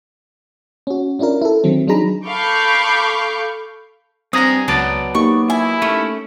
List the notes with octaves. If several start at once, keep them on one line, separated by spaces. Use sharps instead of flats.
C#4 F#4
C#4 D4 E4 F4 A#4
E4 A4
D3 D#3 F#3 C4
F#3 D4 D#4 G#4 A#5 B5
A4 F5 B5 C#6 D6 G6
G2 C4 G#4 G#5 A#5 D#6
C#2 F#3 B3 D5 A5
A#3 D#4 G4 C#6
E4 G#5
A3 C#4